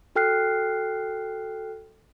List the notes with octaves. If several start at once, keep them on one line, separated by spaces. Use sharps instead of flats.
F#4 A4 G5 F6 F#6 C7